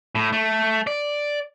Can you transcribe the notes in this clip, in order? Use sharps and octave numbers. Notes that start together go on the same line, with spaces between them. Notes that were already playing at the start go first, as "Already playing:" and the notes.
A2
A3
D5